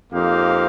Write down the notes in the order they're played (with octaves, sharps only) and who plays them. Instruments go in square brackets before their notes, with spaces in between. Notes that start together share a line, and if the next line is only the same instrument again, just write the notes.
[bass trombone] F2 [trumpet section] A#3 D#4 G4 C5 F5